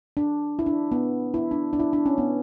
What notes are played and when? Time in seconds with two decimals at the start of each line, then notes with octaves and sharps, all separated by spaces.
0.17 D4
0.59 E4
0.66 D4
0.92 B3
1.34 E4
1.51 D4
1.73 D4
1.79 E4
1.93 D4
2.06 C#4
2.18 B3